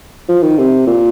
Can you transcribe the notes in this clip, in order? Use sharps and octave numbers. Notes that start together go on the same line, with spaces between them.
F3
D#3
C3
A#2